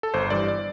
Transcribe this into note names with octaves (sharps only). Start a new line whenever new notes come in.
A4
G1 C5
G2 E3 D5
D5